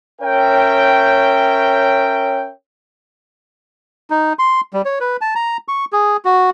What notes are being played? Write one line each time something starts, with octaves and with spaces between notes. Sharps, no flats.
C#4 A#4 C#5 E5 G5
D#4
C6
G3
C#5
B4
A5
A#5
C#6
G#4
F#4